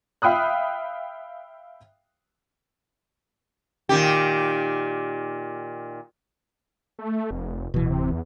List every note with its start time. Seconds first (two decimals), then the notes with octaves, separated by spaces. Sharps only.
0.22 E5 F5 G5 B5 D#6 F#6
3.89 A#2 D#3 G4
6.99 A3
7.31 F1
7.74 D1 B2 E3
7.90 C3
8.11 E2